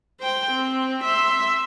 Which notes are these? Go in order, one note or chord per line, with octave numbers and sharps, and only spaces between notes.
C5 G5
C4
E5 C6